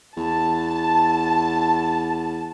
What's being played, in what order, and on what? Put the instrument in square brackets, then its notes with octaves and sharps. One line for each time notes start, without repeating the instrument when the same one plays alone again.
[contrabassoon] E2 [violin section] A5